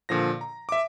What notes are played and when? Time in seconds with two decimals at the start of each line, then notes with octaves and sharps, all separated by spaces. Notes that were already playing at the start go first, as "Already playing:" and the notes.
0.09 A#2 D3 F3 A#6
0.41 A#5
0.69 E5 D6